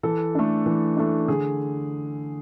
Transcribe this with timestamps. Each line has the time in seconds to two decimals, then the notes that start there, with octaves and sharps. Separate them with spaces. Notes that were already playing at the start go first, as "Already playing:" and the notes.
0.03 E3 A4
0.35 A3 D4
0.66 E3
0.97 A3 D4
1.28 D3 G#4